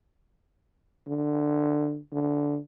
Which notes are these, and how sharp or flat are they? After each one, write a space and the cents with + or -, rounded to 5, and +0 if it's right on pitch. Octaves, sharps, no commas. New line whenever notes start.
D3 +15
D3 -10